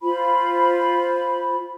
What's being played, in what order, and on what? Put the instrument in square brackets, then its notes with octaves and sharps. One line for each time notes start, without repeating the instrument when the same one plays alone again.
[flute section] F4 C5 B5